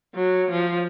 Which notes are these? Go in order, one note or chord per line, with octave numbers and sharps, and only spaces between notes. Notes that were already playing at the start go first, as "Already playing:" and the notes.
F#3
F3